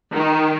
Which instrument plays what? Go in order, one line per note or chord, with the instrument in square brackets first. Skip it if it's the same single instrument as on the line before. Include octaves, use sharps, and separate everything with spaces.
[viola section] D#3